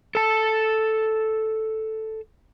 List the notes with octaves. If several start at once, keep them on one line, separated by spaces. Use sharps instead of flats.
A4 A5